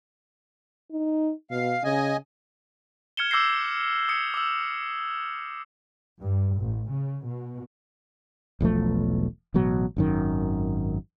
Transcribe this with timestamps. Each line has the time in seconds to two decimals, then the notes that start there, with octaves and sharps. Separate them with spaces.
0.91 D#4
1.51 B2 F5
1.84 C#3 D#5 G#5
3.17 F6 G#6 C#7 E7 G7
3.31 D6 E6 G6 A#6 C7
4.09 D#6 G#6 C#7
4.34 D6 E6
6.20 G2
6.59 A1
6.92 C#3
7.27 B2
8.60 E1 B1 F3 A3
9.54 A1 B2 F#3
9.96 G#1 F#2 D#3